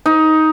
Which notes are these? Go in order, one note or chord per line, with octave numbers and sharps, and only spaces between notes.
D#4